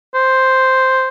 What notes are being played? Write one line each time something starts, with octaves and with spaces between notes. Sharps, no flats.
C5